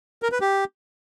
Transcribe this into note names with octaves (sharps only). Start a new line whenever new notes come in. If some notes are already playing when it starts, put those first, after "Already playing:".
A#4
B4
G4